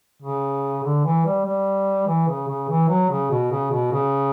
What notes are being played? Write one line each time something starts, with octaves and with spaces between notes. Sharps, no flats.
C#3
D3
E3
G3
G3
E3
C#3
C#3
E3
F#3
C#3
B2
C#3
B2
C#3